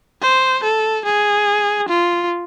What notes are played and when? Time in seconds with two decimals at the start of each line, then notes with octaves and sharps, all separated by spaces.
0.22 C5
0.64 A4
1.05 G#4
1.89 F4